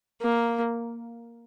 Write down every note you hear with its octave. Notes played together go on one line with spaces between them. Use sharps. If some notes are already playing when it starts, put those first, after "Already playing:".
A#3